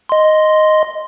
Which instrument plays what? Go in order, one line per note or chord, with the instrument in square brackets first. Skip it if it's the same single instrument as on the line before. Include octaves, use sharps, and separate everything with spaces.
[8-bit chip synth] D#5 C6